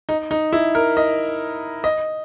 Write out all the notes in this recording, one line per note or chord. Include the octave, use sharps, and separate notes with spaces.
D#4
D#4
E4
A#4
D#5
D#5